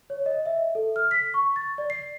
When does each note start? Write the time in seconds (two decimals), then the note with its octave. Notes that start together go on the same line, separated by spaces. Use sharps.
0.10 C#5
0.26 D#5
0.46 E5
0.75 A4
0.96 F6
1.11 B6
1.34 C#6
1.56 A6
1.78 D5
1.90 C7